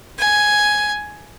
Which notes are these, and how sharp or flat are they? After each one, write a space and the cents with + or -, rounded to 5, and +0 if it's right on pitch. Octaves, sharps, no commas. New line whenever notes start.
G#5 +5